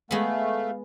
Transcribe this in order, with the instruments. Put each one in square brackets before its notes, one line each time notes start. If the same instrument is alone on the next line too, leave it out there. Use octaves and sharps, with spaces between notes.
[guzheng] G#3 B3 [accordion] A3 [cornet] F5